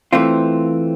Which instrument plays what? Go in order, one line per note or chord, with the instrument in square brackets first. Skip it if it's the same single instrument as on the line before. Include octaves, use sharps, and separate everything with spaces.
[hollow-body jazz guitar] E3 A3 C4 F4